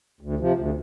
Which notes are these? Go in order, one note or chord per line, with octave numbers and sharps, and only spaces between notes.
D2
C3 F3
D2